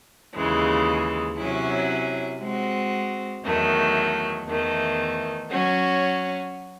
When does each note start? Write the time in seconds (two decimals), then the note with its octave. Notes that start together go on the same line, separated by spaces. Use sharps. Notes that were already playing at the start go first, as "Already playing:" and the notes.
0.36 D#2 C#3 E3 G#3
1.38 C3 F#3 C#4 E4
2.42 G#3 C4 F#4
3.44 E2 D#3 F#3 A3
4.47 E2 D#3 A3
5.49 F#3 C#4 F#4 C#5